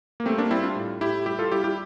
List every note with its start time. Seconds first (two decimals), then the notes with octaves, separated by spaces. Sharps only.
0.20 A#3
0.26 G3 A3 C4
0.38 A#3 D4
0.51 G3 C4 E4
0.63 D4 F4
0.76 A2
1.01 A2 E4 G4
1.26 G3 E4 G4
1.39 F4 A4
1.52 G3 E4 G4
1.64 E4 G4